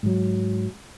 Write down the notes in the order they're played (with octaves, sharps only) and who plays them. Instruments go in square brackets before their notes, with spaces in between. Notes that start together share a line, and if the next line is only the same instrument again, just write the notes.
[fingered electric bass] G#2 F#3